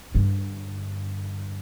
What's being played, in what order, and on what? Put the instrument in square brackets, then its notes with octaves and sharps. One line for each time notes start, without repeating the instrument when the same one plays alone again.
[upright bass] G2 D3